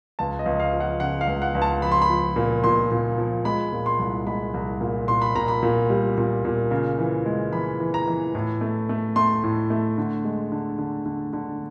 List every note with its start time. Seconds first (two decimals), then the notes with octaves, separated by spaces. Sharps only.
0.19 C#2 A5
0.39 D#5
0.46 C#2
0.60 F5
0.73 F3
0.80 F#5
1.00 C#3 F#5
1.21 F5
1.28 C#2
1.42 F#5
1.55 C#2
1.62 A5
1.82 F3 B5
1.92 C6
2.02 B5
2.10 F3
2.36 A#2
2.64 A#2 C6
2.91 A#2
3.18 F3
3.45 G#3 B5
3.72 A#2
3.86 C6
3.99 C2
4.27 G#3 B5
4.54 C2
4.81 A#2
5.08 A#2 C6
5.22 B5
5.35 A#2 A#5
5.48 B5
5.63 A#2
5.90 G3
6.18 A#2
6.45 A#2
6.71 C#3
6.99 E3
7.26 G#3
7.53 E3 B5
7.80 E3
7.94 A#5
8.08 E3
8.35 A2
8.61 A3
8.89 A3
9.16 A3 C6
9.44 A2
9.70 A3
9.98 D3
10.24 G#3
10.52 D3
10.79 D3
11.06 D3
11.33 D3